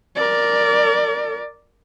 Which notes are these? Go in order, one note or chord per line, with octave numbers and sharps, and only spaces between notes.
A#4 D5